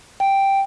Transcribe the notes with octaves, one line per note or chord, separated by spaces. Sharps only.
G5